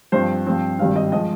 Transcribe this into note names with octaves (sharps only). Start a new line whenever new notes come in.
G2 F3 C4 C5
G2 F3 C4
G#1 G2 G3 C4 F5
D#5
F3 G#3 D#5